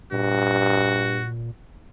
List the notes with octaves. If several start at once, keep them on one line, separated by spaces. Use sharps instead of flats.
G2 A#2 F#4